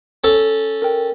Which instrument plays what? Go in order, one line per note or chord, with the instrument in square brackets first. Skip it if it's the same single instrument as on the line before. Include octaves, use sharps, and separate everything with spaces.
[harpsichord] C#4 A4
[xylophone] A#4 G5